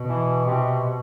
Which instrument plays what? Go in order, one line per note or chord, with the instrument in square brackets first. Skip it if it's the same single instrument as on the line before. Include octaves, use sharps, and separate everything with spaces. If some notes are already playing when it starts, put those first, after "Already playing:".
Already playing: [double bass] B2
[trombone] E3
C3